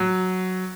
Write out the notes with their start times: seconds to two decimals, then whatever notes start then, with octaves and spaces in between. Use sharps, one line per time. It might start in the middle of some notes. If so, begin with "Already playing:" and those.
Already playing: F#3